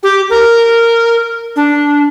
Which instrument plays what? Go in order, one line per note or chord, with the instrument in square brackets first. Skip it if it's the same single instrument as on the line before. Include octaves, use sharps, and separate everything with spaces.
[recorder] G4
A#4
D4